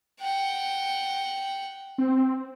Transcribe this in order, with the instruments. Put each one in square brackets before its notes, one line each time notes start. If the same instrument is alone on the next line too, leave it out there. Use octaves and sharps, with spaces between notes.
[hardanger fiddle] F#5 G5
[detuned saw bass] C4